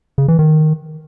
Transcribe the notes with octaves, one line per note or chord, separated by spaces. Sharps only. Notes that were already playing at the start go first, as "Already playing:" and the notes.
C#3
E3
D#3